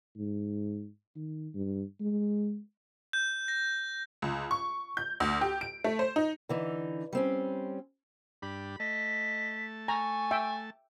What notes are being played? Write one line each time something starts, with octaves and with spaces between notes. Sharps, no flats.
G#2
D#3
G2
G#3
G6
A#6
C#2
C#6
G6
D2
G4
D7
A3
C5
D#4
D3 E3 D#4
G3 C4 C#4
G2 D4 G4 B5
A3 D#5 A5 B6
G#5 A#5 C#6
E5 G5